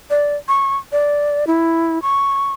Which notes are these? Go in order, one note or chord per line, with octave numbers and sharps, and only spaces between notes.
D5
C#6
D5
E4
C#6